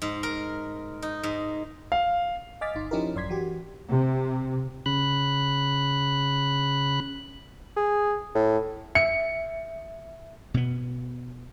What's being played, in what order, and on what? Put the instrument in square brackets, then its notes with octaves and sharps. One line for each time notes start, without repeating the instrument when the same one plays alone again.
[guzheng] G#2
A#4
D#4
G#2
[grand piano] F5
[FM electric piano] D#5 G#5 D6 F6 A6 B6
G1 D#4 C6
F3 C#4 D#4 E4 G4 A#4
G#1 F#2 D5 C6 G#6 B6
E3 F#4 G4
[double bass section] C3
[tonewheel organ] C#3 B5 F#6
[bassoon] G#4
A2
[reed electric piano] E5 [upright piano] C#7
[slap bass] B2 B3